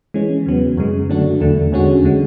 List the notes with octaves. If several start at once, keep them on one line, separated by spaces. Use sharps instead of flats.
E3 G#3 C#4
E2 C#3 F#3 B3
F#2 C#3 G#3
D3 F#3 A3 D4 F#4
E2 D3 A3
E2 D3 G#3 C#4 F#4
D3 G#3